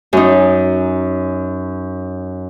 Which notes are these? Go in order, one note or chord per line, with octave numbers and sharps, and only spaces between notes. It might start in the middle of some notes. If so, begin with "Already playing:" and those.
F#2 D#4